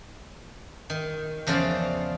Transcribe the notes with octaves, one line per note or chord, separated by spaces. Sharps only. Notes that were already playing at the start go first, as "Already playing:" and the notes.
D#3
E2 C#3 F3 F4 C5 D5